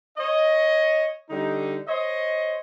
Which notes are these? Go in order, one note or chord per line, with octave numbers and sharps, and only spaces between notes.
C#5 D#5
D3 G3 D#4
C5 C#5 D#5